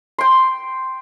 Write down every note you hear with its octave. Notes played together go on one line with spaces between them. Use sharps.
G5 C6